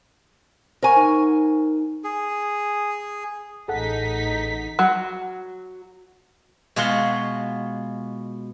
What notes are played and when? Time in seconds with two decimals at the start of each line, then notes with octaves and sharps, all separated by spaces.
0.83 A#4 C5 F#5 G#5 C#6
0.96 D#4
2.04 G#4
3.68 A1 D#4 G#4 A4 F#5 B6
4.79 F#3
6.76 B2 G#3 F4 F#4 F#5 C6